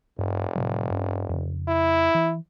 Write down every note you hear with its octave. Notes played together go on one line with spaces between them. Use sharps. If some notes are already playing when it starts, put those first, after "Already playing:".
F1 G2
A2 C3 F#3
G2 C#4
F2 C#3
E4
E3